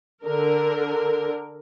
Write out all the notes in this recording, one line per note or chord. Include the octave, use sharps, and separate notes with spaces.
D3 A#4